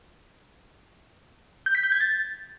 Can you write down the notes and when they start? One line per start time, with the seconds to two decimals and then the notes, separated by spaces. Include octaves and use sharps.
1.66 G6
1.75 B6
1.83 G6
1.92 G#6
2.01 A6